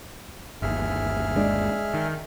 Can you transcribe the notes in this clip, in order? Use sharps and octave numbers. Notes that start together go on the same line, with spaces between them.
G1 D#2 G#4 E5 F6
G#3 D4
D#3